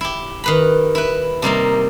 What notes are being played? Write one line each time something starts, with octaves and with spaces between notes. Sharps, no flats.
E4 G4
D#3 B4 B5
E4 B4
C3 G3 A#3 D#4